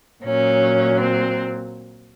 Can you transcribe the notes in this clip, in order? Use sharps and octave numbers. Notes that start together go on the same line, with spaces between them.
A#2 F#3 C#4
C4